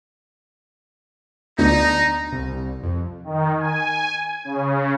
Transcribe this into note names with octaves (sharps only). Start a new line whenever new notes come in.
D2 B3 D4 D#4 A#5
C2
F2
D#3
G#5
C#3